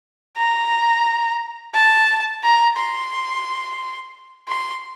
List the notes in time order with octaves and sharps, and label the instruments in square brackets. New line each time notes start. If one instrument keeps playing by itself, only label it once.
[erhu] A#5
A5
A#5
C6
C6